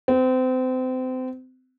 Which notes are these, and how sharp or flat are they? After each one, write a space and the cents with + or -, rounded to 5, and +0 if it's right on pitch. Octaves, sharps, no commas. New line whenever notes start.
C4 -30